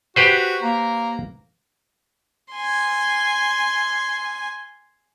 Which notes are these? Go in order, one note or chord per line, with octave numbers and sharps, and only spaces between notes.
F#4 G4 B4 C5
A#3 A#5
G#5 C6